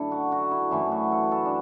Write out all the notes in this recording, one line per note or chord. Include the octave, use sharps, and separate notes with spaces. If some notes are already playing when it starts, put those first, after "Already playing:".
Already playing: F#2 D3 A3 D4 E4 A4
F#4
F#4
E4
F#2 E3 A3 E4
F#4
A4
A4
D4